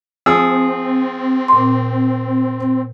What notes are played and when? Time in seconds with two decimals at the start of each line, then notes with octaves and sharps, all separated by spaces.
0.26 F3 C4 G#4 E6
1.48 A#2 C6